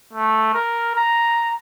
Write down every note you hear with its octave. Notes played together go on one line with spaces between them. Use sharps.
A3
A#4
A#5